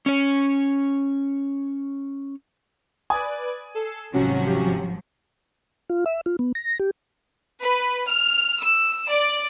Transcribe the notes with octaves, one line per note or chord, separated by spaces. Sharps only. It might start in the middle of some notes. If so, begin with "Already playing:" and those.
C#4 C#5
B4 D5 G#5 D#6
A4 E6 C7
G#1 C3 F3 F#3 C#4 F#4
G4
F4
E5
F4
B3
A#6
G4
B4
F6
E6
D5